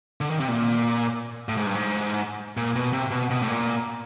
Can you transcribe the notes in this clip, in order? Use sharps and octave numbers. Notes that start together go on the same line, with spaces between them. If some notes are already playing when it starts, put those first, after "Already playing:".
D3
D#3
C3
A#2
A2
G#2
G2
G#2
A#2
B2
C3
B2
B2
A2
A#2